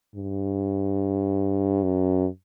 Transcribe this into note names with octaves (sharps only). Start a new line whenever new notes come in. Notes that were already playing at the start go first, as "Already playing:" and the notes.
G2
F#2